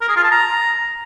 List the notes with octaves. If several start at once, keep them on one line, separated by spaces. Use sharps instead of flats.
A#4
G#4
F4
A5
A#5